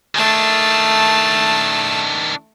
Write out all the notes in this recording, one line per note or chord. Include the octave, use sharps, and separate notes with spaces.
D#3 A3 D4 A5